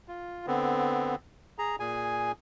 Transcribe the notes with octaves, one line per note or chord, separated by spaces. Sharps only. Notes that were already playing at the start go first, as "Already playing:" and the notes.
F4
D3 B3 C4
G#4 A#5
A#2 G#4 G#5